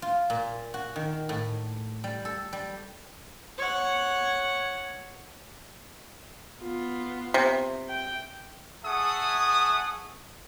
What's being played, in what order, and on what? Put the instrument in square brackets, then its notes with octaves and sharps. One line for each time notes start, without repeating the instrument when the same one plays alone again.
[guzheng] F4
A#2
F#4
D#3
A2
G3
A4
G3
[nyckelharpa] C#5 F#5
[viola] B3 F4
[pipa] C3
[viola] G5
[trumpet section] G#4 E5 F#5 A5 C#6 D#6